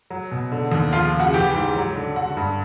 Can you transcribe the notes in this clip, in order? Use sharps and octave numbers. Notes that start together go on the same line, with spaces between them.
F#3
B2
D3
D#2
F3 F4 F5
C#3
F#4 F#5
E3 G4 G5
G#2
F#3
D3
D3 F#4 F#5
G2